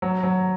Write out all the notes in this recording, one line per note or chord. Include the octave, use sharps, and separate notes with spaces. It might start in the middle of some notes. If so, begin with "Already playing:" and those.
F#3
F#3